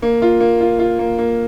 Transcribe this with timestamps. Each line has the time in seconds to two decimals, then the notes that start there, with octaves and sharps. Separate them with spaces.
0.02 A#3
0.22 F4
0.40 A#3
0.61 F4
0.79 F4
0.99 A#3
1.18 A#3